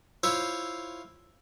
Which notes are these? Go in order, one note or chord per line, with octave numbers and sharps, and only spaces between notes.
E4 F4 C5 C#5 E5